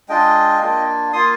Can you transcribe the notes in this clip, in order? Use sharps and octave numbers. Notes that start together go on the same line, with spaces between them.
G#3 D4 F4 D#5 G5
A#3 D4 F4
A#3 F4 C6 D#6